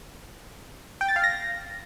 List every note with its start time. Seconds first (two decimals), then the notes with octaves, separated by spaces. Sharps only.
1.01 G5
1.08 A6
1.16 F5
1.24 A#6